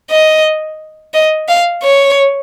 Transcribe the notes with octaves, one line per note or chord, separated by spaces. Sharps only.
D#5
D#5
F5
C#5